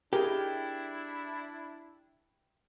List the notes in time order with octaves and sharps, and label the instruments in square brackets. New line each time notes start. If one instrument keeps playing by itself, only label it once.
[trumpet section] D4 E4 [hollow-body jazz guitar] G4 [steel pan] G#4 A#4